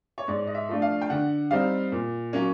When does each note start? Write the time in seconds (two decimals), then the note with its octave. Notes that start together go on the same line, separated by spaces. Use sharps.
0.18 C#5
0.28 G#2 D5
0.47 D#5
0.55 E5
0.69 F3 A3 D4 F4
0.82 F5
1.01 G5
1.10 D3 F#5
1.51 G3 C4 D#4 F5
1.92 A#2
2.33 F#3 A#3 C#4